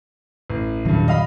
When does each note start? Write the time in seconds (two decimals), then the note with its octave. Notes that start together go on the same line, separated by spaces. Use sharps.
0.50 A1
0.85 E1 G2 A#2 D#3 F#3
1.08 D#5 F5 B5